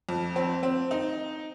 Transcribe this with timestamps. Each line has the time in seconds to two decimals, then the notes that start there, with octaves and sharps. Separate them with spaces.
0.09 F2
0.36 C4
0.63 C4
0.91 D#4